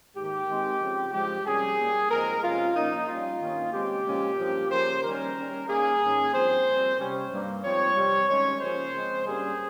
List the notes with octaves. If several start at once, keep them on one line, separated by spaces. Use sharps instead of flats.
G#2 D#3 A#3 G4
D#3 G#3 C4
C#3 F3 C4
G2 F3 G#3 G4
C3 G3 A#3 C#4 G#4
A#2 G3 A#3
G#2 F3 G#3 C4 A#4
C3 F3 G#3 C#4 F4
A#2 F3 A#3 C#4 D#4
A#2 G3 C#4 F4
G2 D#3 A#3 C#4
C#3 G#3 C4 G4
A#2 F3 G#3 C#4
G2 F3 A#3
C#3 F3 A#3 C#4 C5
D#3 G3 A#3 C#4 A#4
D#3 G3 C#4
D#3 A#3 C#4 G#4
G#2 D#3 A#3 C#4
G2 F3 C4 C5
A#2 G3 C4
C3 G3 C#4
G2 G3 A#3
G#2 F3 C4 C#5
C3 G3 C4
D#3 G#3 C#4 C#5
C#3 F3 A#3 C#4 C5
C#3 G#3 C4
G2 G3 A#3 C#4 G#4